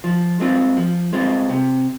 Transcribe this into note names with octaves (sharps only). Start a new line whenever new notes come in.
F3
G#3 C4 F4
F3
G#3 C4 F4
C3